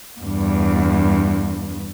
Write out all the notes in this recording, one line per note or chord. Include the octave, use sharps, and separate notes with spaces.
E2 G2